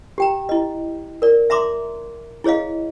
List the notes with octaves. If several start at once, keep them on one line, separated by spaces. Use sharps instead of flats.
G4 G5 A#5
E4 D#5
A#4 D5
E5 A#5 C6 D6
E4 G#4 C#5 D#5 F5